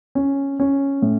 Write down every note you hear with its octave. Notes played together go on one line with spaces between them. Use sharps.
C#4
C#4
A2